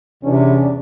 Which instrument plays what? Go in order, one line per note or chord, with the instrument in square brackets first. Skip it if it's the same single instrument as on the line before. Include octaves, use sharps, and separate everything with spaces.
[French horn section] E2 C#4 D4 [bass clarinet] C3